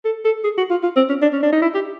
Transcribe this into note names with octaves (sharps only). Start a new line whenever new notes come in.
A4
A4
G#4
F#4
F4
F4
C4
C#4
D4
C#4
D4
D#4
E4
G4